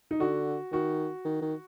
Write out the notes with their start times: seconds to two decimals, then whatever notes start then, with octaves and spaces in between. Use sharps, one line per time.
0.11 D#4
0.20 D3 F#4
0.72 D#3 F#4
1.25 D#3
1.42 D#3